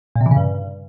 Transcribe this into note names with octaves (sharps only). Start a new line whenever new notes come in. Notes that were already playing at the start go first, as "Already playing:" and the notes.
A#2
C3
E3
C#3
G2